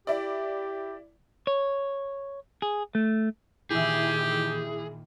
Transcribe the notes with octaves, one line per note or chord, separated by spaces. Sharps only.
E4 G4 D5
C#5
G#4
A3
A#2 D#3 E3 G4 G#4 E5